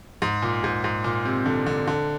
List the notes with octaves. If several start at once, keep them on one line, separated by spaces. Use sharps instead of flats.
G#2
A#2
G#2
G#2
A#2
C3
D3
D3
D3